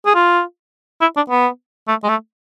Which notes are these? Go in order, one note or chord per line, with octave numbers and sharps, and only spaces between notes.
G#4
F4
E4
D4
B3
A3
G#3
A3